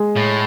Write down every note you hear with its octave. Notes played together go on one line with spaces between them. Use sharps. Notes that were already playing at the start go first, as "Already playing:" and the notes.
Already playing: G#3 G#4
A2